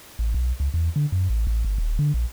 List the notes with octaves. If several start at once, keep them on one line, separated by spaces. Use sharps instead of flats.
A1
B1
C#2
E2
D3
F#2
A1
A1
G1
D#1
D3
A#1